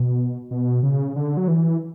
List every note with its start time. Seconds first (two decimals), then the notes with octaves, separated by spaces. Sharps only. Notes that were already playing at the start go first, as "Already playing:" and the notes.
Already playing: B2
0.51 B2
0.83 C#3
1.16 D3
1.37 F#3
1.48 E3